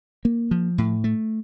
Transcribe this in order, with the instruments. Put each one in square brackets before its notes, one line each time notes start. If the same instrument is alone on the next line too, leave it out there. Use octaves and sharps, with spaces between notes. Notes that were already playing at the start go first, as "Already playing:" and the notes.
[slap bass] A#3
F3
A2
A3